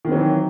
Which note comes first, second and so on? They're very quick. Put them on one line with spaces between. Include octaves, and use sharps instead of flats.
D#3 C4 F#3 E3